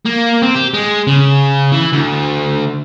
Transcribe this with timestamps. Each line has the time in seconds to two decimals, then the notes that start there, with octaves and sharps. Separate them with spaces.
0.06 A#3
0.42 C4
0.55 G4
0.74 G#3
1.07 C#3
1.72 E3
1.93 D2